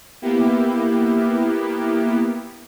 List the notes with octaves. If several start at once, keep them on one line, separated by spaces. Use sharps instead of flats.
A#3 B3 E4 G4